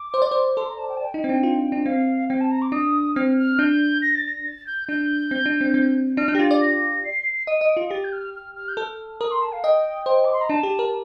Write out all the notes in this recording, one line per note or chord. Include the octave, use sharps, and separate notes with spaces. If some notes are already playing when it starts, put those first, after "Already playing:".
Already playing: D6
C5
D5
C5
A4 C6
A#5
A5
G5
A5
G5
D#4
C4
D4
F4
D4
C4 F5
C4 G5
A5
A#5
D6
D4 D#6
C4 F6
F6
D4 G6
A#6
A6
A#6
A6
G6
D4 G6
C4
D4
C4
C4
D4 F6
D4 G6
G4 A#6
F4 A6
D5 A6
A#6
C7
D#5 D#7
D#5
D7
F4
G4 A6
G6
F6
F6
F6
G6
A4
F6
A#4 D#6
C6
A5
F5
D#5 G5
C5 G5
D6
C6
A#5
D4 A5
G4
A#4